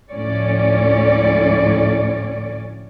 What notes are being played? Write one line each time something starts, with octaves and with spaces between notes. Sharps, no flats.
D2 A2 F3 C#4 C#5 D5